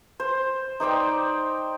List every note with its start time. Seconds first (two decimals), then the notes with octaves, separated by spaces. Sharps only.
0.20 C5
0.80 D#4 C5 D5 G5